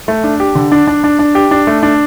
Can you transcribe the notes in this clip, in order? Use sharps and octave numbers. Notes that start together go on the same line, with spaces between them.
A3
D4
G4
D3
D4
D4
D4
D4
G4
D4
A3
D4